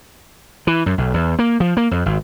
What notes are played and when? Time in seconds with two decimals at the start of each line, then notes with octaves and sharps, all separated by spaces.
0.67 E3
0.86 F#2
0.98 B1
1.14 E2
1.39 A#3
1.60 F3
1.77 A#3
1.91 F2
2.06 G#1